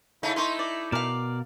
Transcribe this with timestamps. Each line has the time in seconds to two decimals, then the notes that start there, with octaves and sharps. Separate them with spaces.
0.23 C#3 A3 D#4 E4
0.36 A3 D#4 C6 C#6
0.59 D5
0.92 B2 A#4 D5 F5